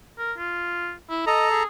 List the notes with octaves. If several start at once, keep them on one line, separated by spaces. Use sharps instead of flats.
A#4
F4
E4
A4 D#5 A#5
G#4